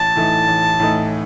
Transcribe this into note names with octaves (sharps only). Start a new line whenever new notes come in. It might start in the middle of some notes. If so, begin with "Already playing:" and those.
Already playing: A1 A5
A2 E3 A3 D#4
A1
A2 E3 A3 D#4